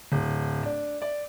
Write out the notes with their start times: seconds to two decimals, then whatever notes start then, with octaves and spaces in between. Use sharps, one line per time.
0.12 D1
0.63 D4
1.02 D5